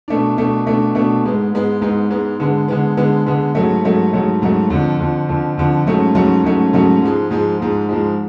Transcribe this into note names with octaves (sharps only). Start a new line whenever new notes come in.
B2 A3 D4
B2 A3 D4
B2 A3 D4
B2 A3 D4
G#2 G#3 B3
G#2 G#3 B3
G#2 G#3 B3
G#2 G#3 B3
D3 G#3 B3
D3 G#3 B3
D3 G#3 B3
D3 G#3 B3
G#2 F#3 A3
G#2 F#3 A3
G#2 F#3 A3
G#2 F#3 A3
F2 D3 F3
F2 D3 F3
F2 D3 F3
F2 D3 F3
G#2 F#3 A3 C#4
G#2 F#3 A3 C#4
G#2 F#3 A3 C#4
G#2 F#3 A3 C#4
G#2 F3 G#3
G#2 F3 G#3
G#2 F3 G#3
G#2 F3 G#3